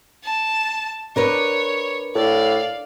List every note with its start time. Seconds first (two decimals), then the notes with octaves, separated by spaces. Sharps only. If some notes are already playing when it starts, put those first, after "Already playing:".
0.23 A5
1.16 D4 A#4 B4 C#5
2.15 A2 D5 F5